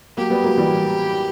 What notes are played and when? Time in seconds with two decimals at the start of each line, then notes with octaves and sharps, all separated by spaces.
0.17 F#3 A#3 G4
0.30 G3 B3
0.44 F#3 A#3
0.58 E3 G3